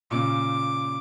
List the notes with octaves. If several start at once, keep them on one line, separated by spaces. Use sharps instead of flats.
A#2 C#3 D6